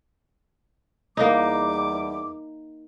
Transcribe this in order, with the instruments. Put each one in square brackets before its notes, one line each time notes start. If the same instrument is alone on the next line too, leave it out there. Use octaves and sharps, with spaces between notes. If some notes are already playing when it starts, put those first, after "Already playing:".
[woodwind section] E2 G3 D6 [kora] A#3 D#4